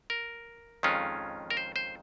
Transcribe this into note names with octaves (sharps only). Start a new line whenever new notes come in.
A#4
F2 D#3 G#3 C#4 F4
A#4
C5
C5